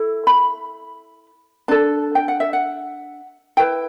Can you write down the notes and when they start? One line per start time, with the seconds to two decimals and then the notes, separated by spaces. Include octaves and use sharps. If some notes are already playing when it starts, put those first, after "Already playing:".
Already playing: E4 A4
0.27 B5
1.68 D4 A4 A5
2.15 G5
2.28 F#5
2.40 E5
2.53 F#5
3.57 E4 B4 G5